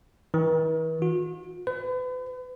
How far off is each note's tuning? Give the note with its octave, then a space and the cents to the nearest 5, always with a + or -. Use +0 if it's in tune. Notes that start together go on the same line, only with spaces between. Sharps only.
E3 -45
F#4 -45
B4 +40